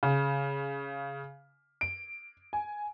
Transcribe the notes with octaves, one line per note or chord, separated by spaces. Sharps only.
C#3
D7
G#5